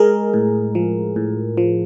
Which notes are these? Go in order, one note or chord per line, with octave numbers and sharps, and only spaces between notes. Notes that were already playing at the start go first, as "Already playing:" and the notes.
Already playing: G#3 G#4 A#4
A2
F3
A2
F3